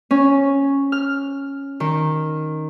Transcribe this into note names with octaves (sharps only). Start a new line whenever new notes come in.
C#4
F6
D#3